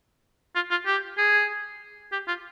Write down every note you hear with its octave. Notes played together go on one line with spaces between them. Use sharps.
F4
F4
G4
G#4
G4
F4